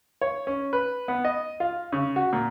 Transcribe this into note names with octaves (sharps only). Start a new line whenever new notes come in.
C#5
C#4
B4
B3
D#5
F4
C#3
F#4
A#2